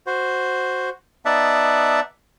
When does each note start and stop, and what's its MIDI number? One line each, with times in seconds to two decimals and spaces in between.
0.07 0.89 66
0.07 0.89 72
1.26 2.00 59
1.26 2.00 63
1.26 2.00 74
1.26 2.00 76
1.26 2.00 78
1.26 2.00 81